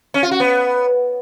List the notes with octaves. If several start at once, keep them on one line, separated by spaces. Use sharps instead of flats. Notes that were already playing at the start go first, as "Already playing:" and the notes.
C#4
F4
F#4
B3